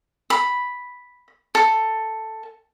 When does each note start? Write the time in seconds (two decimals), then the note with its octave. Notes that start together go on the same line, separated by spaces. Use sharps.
0.30 B5
1.55 A4